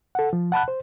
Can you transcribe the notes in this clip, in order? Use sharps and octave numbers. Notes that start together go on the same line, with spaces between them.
A4 F#5
F3
F#5 A5 B5 F#6
C5